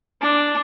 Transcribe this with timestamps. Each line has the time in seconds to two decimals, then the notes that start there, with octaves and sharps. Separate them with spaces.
0.21 D4